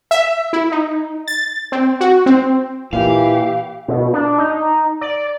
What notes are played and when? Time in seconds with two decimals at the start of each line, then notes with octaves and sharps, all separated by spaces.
0.11 E5
0.53 E4
0.72 D#4
1.27 A6
1.72 C4
2.01 F#4
2.26 C4
2.93 A#2 E3 G4 F5
3.88 B2
4.14 D4
4.38 D#4
5.01 D5